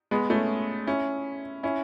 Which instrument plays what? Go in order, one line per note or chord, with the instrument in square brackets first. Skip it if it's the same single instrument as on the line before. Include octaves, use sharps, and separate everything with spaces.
[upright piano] G#3 B3
A3 C#4
C#4 E4
C#4 E4